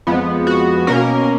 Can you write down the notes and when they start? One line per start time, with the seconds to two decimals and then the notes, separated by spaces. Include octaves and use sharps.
0.07 F2 F3 G#3 B3
0.47 F#4
0.87 B2 A#3 C#4 A#4